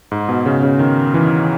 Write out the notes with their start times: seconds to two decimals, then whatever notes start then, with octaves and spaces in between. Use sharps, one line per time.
0.12 G#2
0.29 B2
0.46 C#3
0.63 C#3
0.79 D#3
1.14 E3